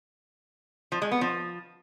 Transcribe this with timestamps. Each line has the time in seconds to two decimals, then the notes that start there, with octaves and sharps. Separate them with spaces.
0.92 F3
1.02 G#3
1.11 B3
1.21 F3